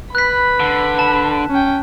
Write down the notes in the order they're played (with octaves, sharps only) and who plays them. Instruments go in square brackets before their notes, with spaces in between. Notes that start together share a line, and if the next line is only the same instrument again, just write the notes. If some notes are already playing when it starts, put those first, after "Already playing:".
[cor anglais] B4 [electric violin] B5 [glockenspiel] F#6 B6
[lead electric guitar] D3
[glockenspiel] A5
[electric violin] C#4 G5